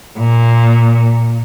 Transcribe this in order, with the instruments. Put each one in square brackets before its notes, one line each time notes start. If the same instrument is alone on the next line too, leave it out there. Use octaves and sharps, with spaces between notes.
[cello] A#2